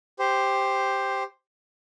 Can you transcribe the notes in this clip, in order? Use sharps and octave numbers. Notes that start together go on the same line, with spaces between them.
G4 C5